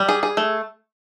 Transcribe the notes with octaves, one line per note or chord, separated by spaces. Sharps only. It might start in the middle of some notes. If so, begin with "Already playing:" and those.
Already playing: G3
G#4
G#4
A3